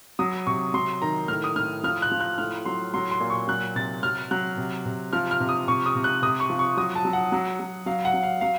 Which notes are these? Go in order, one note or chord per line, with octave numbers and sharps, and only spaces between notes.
F#3 D#6
C3 C#6
F#3 C6
D#3 A#5
A2 F6
D#6
A2 F6
F3 F6
F#6
F3
F#6
A2 F6
F#3 C6
F#3 C6
C6
A#2
C#6
F#3 F#6
C3 A6
F#3 F6
F#3 F#6
C3
C3
F3 F6
F6
C3
D#6
C3 C#6
D#6
C3
F#6
C3 D#6
C#6
F3
C#6
F#3 D#6
A5
F#3
F#5
F#3
F#3
F#3 F5
F#5
F#3
F5
F#3 F5